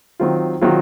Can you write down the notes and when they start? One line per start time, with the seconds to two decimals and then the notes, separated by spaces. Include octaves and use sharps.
0.20 D#3 F#3 C4 F4
0.61 D#3 F#3 C4 F4